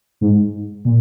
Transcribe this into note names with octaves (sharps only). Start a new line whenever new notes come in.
G#2
A#2